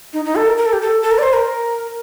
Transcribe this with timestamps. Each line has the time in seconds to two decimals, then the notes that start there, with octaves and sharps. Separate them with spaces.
0.13 D#4
0.25 D#4
0.36 A4
0.47 A#4
0.57 A#4
0.66 A4
0.73 G4
0.82 A4
1.02 A4
1.11 A#4
1.18 D5
1.23 C5
1.33 A#4